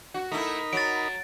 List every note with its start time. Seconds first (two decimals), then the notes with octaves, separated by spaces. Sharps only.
0.14 F#4
0.32 A3 D#4 E4 A#4 B5
0.73 F#3 A6 D7